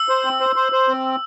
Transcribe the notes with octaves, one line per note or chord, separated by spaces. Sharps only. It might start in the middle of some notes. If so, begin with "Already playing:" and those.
Already playing: E6
C5
C4
C5
C5
C5
C4